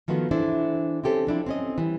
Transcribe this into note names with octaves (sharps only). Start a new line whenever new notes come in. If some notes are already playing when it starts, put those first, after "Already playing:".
D#3 F3 A3 B3 F#4
E3 D4 E4 A4 C5
C4 C#4 G4 A4 C5
F3 D4 E4
C4 C#4 D#5
E3 G3